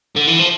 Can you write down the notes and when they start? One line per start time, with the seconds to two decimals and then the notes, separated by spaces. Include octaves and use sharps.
0.16 D3
0.27 E3
0.39 F3